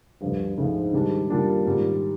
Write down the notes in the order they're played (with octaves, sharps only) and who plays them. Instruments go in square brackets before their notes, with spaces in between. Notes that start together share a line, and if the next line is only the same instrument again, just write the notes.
[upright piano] D2 D3 F3 [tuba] G2
[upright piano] D2 D3 F3 [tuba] G#2
[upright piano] D#3 G3 D4
[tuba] A#2 [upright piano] D#3 G3 D4
[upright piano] G#2 D#3 G3